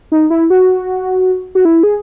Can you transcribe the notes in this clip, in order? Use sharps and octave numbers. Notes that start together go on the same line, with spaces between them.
D#4
E4
F#4
F#4
E4
G#4